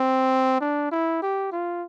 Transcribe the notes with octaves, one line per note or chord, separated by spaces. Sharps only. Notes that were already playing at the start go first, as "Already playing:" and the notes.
Already playing: C4
D4
E4
G4
F4